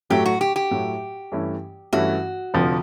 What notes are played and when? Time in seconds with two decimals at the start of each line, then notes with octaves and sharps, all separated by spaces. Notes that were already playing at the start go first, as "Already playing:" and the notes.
0.10 A2 F#3 A3 G4
0.26 F#4
0.41 G4
0.56 G4
0.71 A2 F#3 A3
1.32 G2 E3 A3 C#4 E4
1.93 G2 E3 A3 C#4 E4 F#4
2.54 F1 F2 D3 F3